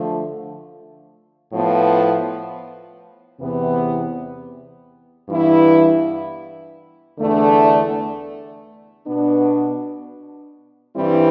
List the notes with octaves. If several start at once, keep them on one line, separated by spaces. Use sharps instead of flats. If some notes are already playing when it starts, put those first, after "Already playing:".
Already playing: D3 F3 A3
A2 F3 B3
E2 C3 E3 B3
G2 E3 B3 E4
E2 D3 A3 D4
B2 B3 D4
G2 E3 G3 C4 E4